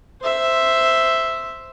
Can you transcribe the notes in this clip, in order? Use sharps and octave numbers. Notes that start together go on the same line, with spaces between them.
C5 E5